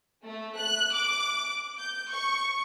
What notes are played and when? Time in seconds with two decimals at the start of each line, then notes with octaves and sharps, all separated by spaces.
0.23 A3
0.57 F#6
0.93 D6
1.79 G6
2.11 C#6